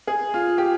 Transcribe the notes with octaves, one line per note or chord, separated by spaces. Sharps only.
G#4
F4
G4